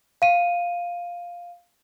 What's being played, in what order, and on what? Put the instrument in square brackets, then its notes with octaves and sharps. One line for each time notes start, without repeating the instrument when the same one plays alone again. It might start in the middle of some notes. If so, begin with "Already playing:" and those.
[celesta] F5 D#7